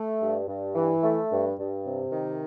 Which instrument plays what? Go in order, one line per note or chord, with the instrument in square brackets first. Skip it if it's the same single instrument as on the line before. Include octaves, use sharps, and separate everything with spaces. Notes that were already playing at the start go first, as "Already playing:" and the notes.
Already playing: [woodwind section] A3
G2
G2
E3
A3
G2
G2
C3
D#3